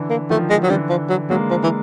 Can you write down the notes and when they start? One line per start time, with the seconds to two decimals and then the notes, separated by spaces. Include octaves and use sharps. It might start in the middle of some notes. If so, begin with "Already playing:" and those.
Already playing: D3 E3
0.10 A#3
0.30 D#3 F3 A3
0.50 G#3
0.63 F#3
0.70 D3 E3 G3
0.90 F3
1.10 F#3
1.30 F#3 G#3 A#3
1.51 F3
1.64 E3